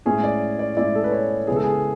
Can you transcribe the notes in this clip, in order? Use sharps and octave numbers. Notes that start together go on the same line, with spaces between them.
A2 G#3 C#4 E4 G#4
D5
D5
A2 G#3 C#4 E4 D5
A4
B4
C#5
C#3 G#3 B3 E4 G#4
A4
G#4